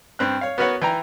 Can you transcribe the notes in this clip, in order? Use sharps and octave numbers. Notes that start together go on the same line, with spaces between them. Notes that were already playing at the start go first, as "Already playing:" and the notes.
G2 C4 F#6
C#5 F5
B3 F#4 A#4 B4 C#5 F#5
E3 G5 A#5